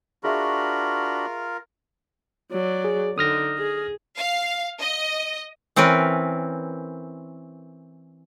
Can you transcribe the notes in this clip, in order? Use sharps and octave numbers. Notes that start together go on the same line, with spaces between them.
D4 F4 F#4 G#4 A#4 E5 B5 C#6
F#3 D5
G#4
D3 D#4 D#6 F6 A#6
G#4
F5
D#5
E3 C4 C#4 A#4 B4